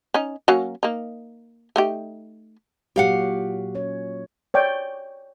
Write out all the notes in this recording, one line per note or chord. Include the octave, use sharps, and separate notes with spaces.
C#4 D#4
F#3 A#3 C#4
A#3 D#4
A3 D#4 G4
A#2 F#3 F#4 G4 F5 F#5
C#4 C#5
C#5 D5 G5